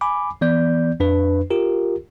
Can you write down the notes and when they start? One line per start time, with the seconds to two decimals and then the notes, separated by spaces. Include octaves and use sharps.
0.01 G#5 B5 D6
0.41 E3 B3 D5 G6
1.00 F2 D4 B4
1.51 F4 G4 A#4